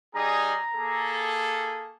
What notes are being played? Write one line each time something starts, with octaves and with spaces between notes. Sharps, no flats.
G3 D#4 G#4 A#5
A#3 G#4 A4